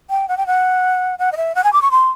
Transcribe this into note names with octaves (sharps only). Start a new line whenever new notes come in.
G5
F#5
G5
F#5
F#5
D#5
E5
F#5
G#5
D6
C#6
C6